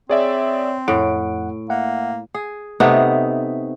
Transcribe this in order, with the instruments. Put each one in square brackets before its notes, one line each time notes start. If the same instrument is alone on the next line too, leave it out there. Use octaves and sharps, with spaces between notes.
[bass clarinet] C4 [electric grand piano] G#4 D5 E5 [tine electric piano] C#5
[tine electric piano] F2 F#5 [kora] A2 [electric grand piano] D7
[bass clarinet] A#3 [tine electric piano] E5 F#5
[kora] G#4
C3 A3 B3 D#4